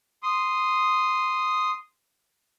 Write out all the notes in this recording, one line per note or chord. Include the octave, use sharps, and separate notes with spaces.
C6 D#6